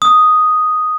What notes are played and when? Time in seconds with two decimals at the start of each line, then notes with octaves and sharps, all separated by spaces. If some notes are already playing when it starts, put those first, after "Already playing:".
0.02 D#6